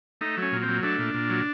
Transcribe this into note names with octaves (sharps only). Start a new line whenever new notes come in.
A3 D#4
F#3
C#4
A#2
C4
F#3
A3 D4
A#2
A#2
F#3